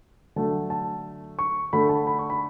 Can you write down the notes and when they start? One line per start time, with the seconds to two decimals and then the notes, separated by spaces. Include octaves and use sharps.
0.36 D3 F#3 A3 A5
0.70 A5
1.39 C#6
1.73 D3 A3 B5
1.89 A5
2.07 B5
2.19 C#6
2.30 B5